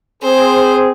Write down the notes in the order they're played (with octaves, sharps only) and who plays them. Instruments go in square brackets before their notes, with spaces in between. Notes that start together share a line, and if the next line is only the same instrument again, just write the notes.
[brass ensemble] C4 G#4 [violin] C5